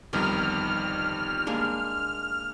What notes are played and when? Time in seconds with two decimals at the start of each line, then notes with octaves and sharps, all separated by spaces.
0.13 G1 F2 D#3 G3 B3 D#4 F6
1.47 G#3 A#3 D4